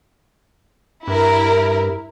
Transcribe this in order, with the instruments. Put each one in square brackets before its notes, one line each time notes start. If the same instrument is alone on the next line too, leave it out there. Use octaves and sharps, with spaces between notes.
[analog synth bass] G2 [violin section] E4 A#4